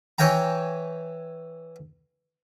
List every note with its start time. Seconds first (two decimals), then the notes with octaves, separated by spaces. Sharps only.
0.18 E3 C#5 G5 G#5 A#5